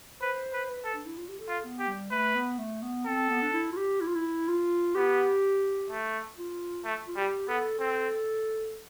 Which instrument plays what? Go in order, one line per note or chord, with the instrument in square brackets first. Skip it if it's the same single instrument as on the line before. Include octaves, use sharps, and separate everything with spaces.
[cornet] B4 [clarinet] C5
[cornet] B4
[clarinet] B4
[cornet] A4
[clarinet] D4
E4
F4
G4
A4
[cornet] F4
[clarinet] B3
[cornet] G4
[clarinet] G3
[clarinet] A3 [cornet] B4
[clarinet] B3
A3
B3
[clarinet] C4 [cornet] A4
[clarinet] B3
D4
E4
F4
G4
E4
F4
E4
F4
[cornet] B3 [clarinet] G4
[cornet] A3
[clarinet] F4
[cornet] A3
[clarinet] F4
[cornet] G3 [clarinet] G4
[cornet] B3 [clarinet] A4
[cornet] C4 [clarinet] A4